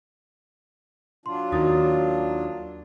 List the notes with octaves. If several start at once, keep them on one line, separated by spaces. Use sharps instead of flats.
F#3 D4 F4 C6
D#2 D#3 A#3 F#4 D#6 A6